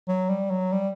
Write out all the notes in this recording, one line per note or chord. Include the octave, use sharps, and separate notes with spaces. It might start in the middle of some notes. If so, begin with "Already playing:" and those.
F#3
G3
F#3
G3